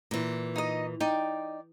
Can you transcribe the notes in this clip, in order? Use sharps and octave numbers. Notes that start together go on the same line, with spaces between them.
A#2 E3
D#4 D#5
D#4 D5 G5